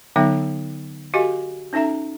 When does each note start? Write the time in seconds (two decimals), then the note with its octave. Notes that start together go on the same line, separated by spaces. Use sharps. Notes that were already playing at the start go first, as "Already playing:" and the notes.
0.16 D3 F#3 B3 D#4 E5 G5
1.14 F#4 G4 A4 D#5 F5 G#5
1.73 C#4 D#4 A4 E5 A#5